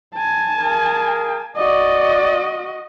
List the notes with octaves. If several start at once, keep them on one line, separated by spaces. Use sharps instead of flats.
G#5 A5
A#3 G#4 A#4
F#4 D5 D#5